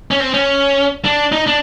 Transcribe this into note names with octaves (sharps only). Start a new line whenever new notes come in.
C#4
C4
C#4
D4
D#4
D4